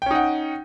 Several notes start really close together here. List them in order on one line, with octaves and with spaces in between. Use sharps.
G5 C#4 D#4 F#5